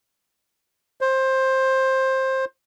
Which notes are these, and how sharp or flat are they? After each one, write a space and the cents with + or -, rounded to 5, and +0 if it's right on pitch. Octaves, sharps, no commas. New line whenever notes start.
C5 +15